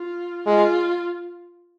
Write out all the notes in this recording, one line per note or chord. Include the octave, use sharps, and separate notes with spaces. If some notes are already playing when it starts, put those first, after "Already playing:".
Already playing: F4
G#3 F4